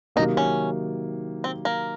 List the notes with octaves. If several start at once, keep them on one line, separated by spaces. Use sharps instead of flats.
C3 D#3 F#3 A#3 D#4
C#4
C4
A#3